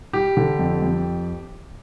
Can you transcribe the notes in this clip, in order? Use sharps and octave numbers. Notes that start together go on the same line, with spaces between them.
G3 G4
D3
F2
F2